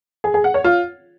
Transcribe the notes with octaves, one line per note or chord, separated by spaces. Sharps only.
G#4
G#4
F#5
C#5
F4